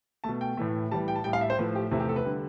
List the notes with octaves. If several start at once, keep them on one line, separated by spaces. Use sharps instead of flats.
B2 A3 A5
G5
A2 E3 A3
A2 E3 G3 A5
G5
A5
A2 G3 G5
F5
E5
C5
A2 F3 A3 B4
G4
E2 C3 F3 A3 E4
G4
A4
B4
D3 G3